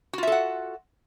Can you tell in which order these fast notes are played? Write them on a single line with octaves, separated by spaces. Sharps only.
F#4 F4 E5 A4 F#5